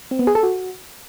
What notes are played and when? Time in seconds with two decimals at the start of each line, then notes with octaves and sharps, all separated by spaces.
0.11 C4
0.19 B3
0.27 G#4
0.35 A4
0.43 F#4